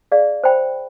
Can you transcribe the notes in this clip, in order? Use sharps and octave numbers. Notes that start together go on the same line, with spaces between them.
G#4 D5 F5
C5 G5 B5